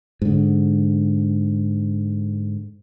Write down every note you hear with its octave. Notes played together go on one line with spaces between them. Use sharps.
G#2 D3